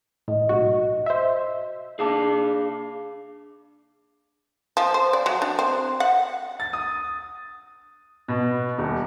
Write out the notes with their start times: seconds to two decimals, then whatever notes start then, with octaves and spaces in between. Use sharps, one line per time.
0.28 A2 D#5
0.49 B1 G#2 F#4
1.06 C5 E5
1.99 D4 G#4 F5 A5 D6 C7
4.77 F3
4.94 C5
5.13 D5
5.26 F#3
5.42 D4
5.59 C4
6.00 F#5
6.60 A6
6.73 D#6
8.28 B2
8.78 D#1